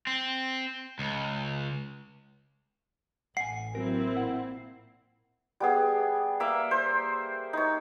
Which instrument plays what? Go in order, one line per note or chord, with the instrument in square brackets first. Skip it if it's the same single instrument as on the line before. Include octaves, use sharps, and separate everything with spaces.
[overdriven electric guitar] C4
C#2
[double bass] A1 [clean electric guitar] F#5 G#5 [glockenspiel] C7
[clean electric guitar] F#3 F#4 A#4 [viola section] A#3 C4 E4
[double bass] A#2 [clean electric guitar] F#5
[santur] G3 B3 G#4
A#3 E5
C5
D#4 C#5